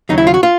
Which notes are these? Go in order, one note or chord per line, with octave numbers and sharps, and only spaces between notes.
D#2 C#3 F#3 D#4
E4
F4
F#4
F4